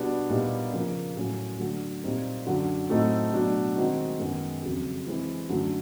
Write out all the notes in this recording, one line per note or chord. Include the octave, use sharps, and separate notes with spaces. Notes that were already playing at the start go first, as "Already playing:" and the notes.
Already playing: B2 G3 B3 D4 F#4
A#2 G3 B3 D#4
C#3 F3 A#3
A2 F#3 A#3 C#4
D3 F#3 A3
A#2 G3 C4 D#4
F#2 D3 F#3
A2 F#3 A3 C4 D#4
B2 F#3 A3 D4
D#3 G#3 C4 D#4 F#4
F#2 D#3 G#3 B3
F2 C#3 F#3
E3 G#3 C4 E4
F#2 D3 F#3 A3